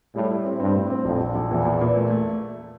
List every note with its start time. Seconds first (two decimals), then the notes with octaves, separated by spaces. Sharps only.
0.15 A2 G3
0.31 E4
0.45 C4
0.60 G2 C4
0.75 A2
0.90 C4
1.05 A#1 F2
1.20 A#1
1.35 A#1
1.50 E2 A#2
1.65 A#2
1.81 A#2
1.96 A3
2.10 A3